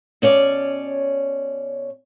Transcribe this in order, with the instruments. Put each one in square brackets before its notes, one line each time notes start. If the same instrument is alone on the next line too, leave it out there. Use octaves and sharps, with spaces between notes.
[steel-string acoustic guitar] B2 C#4 C#5 D5